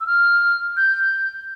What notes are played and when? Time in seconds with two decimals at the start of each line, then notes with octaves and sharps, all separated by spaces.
0.01 E6
0.07 F6
0.77 G6